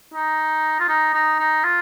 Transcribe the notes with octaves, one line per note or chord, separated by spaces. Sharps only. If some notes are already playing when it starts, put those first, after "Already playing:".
D#4
F4
D#4
D#4
D#4
F4